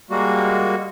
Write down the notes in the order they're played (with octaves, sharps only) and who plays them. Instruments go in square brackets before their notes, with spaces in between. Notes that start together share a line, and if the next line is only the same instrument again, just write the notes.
[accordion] G3 G#3 A#3 F#4